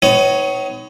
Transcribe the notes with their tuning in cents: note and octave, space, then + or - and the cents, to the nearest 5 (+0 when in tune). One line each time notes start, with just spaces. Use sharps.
B3 +45 D#4 +15 C#5 +0